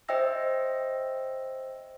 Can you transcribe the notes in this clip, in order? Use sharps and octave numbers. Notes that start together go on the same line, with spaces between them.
C5 D#5 E5 G5 E6 A#6